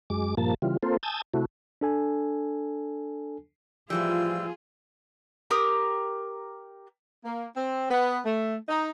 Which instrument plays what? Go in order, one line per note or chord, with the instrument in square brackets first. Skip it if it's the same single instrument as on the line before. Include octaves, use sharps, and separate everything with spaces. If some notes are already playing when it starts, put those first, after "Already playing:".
[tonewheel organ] F#2 G#3 D6
G2 A#2 F3 A#3 A5
C#3 E3 G3 F4
A#3 C4 F4 A4 C5
G#5 A5 D#6 E6 G6
C3 A3 E4 F#4
[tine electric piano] D4 A4 G#5
[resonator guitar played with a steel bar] A2 E3 G3 [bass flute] F3 [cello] F4 G#4 [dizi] E6
[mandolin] G4 A#4 D#6
[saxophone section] A#3
C4
B3
A3
D#4